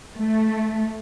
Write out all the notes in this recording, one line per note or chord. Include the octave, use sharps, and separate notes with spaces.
A3